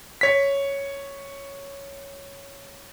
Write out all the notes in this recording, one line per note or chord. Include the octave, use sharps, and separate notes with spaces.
C#5 B6